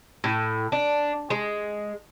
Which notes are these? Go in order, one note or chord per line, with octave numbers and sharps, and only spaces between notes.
A2
D4
G#3